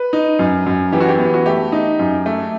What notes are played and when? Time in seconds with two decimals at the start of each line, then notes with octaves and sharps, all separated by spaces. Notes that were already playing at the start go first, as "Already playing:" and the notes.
Already playing: B4
0.13 D#4
0.39 F#2
0.66 F#2
0.92 E3 G4
1.00 F#4
1.08 G4
1.19 B3
1.34 F#4
1.46 A3 G4
1.72 D#4
1.99 F#2
2.26 A3